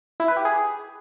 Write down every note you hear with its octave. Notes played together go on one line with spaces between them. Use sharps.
E4
B4
G4
G#4